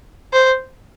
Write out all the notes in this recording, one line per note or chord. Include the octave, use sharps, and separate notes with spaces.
C5